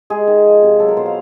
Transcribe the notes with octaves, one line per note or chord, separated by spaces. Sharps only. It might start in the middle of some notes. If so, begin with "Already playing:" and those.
G#3 G#4
D#3
F3
C3
F#3 A4
A#4
B2 C5
F5